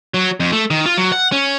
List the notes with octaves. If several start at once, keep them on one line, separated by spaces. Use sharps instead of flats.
F#3
F2
A3
D#3
F4
F#3
F#5
C#4